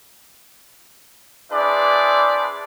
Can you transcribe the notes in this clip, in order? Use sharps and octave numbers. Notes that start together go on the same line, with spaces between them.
D4 E4 G#4 B4 C5 D5